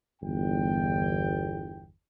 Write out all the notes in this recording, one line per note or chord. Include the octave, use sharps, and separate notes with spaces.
G1 E2 G5